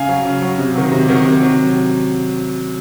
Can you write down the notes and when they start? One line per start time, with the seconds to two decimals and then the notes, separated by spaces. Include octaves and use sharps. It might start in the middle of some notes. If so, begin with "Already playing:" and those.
Already playing: C#3 F5 G#5
0.09 F#3
0.25 C#3
0.42 F#3
0.58 C3
0.75 D#3 F#3
0.91 C3
1.08 D#3 F#3
1.25 C3
1.42 F#3